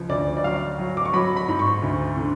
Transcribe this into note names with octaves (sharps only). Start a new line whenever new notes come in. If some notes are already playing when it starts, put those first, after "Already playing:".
Already playing: C#2 F3
D2 D5
D5
F#3 F5
F#3
D6
C#6
F#3 B5
B5
G#2
C#6
D2
D3